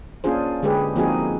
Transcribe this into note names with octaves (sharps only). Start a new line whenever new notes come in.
A#3 C#4 D4 F4 G#4 C5
D3 G#3 G4 G#4 B4
F3 A#3 C4 D#4 F#4 G#4